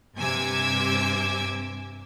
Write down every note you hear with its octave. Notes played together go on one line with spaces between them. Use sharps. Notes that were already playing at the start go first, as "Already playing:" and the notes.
G2 C3 G#5 D6 E6 G#6